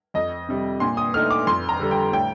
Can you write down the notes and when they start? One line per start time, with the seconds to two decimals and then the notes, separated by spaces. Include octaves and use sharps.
0.14 F2 D#5
0.48 C3 G3
0.80 A#2 C6
0.97 D#6
1.14 A3 D#4 F6
1.31 D6
1.47 F2 C6
1.69 A#5
1.80 D3 G3
1.91 G5
2.13 A2 G5